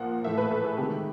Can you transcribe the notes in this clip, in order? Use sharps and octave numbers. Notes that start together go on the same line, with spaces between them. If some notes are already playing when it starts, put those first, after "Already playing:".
Already playing: A#2 F3 A#3 F#5
A2 E3 A3 E5
B4
A4
G#4
C3 D#3 G#3 G4